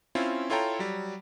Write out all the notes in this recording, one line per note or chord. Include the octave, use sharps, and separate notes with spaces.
C4 C#4 E4 F4
E4 F4 A4 C#5 G5 A#5
F#3 G3